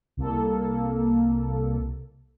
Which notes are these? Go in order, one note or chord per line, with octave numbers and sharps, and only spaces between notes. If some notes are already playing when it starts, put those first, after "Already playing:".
C2 A#3 A4